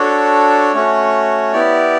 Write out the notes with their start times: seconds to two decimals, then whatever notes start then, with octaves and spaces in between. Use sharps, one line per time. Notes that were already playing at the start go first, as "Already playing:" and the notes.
Already playing: D4 F#4 A4 C#5
0.73 A3 C#4 F#4
1.53 B3 E4 G4 D5